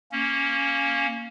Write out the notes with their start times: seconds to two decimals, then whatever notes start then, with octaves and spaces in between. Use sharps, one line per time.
0.12 A#3 C#4